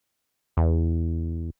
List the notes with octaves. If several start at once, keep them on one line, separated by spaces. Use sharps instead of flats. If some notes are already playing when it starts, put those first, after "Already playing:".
E2